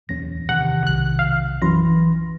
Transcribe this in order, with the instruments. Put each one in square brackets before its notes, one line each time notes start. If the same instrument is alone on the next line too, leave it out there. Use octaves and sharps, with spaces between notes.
[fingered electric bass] D1 E2 C#4 [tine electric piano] A#6
[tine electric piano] C3 D#3 [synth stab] F#5
[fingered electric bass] B1 [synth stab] F#6
[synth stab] F5
[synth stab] F#2 [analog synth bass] E3 [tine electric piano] B5 C6 A#6